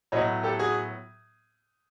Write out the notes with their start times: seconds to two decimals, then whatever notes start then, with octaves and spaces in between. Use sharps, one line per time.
0.12 A2 F#3 B3 C#5 D#5
0.44 G4 A4
0.59 F#4 G#4